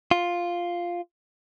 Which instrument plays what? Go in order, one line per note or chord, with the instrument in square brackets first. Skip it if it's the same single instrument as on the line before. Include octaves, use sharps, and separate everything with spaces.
[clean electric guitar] F4